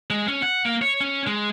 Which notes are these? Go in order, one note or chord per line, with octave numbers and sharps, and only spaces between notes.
G#3
C#4
F#5
A#3
C#5
C#4
G#3